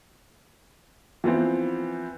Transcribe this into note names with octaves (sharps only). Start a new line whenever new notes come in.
E3 F3 B3 C4